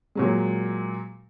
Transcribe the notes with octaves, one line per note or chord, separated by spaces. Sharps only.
A#2 F#3 G#3